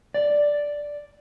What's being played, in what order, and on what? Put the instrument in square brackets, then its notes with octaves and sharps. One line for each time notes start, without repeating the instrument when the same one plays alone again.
[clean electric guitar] D5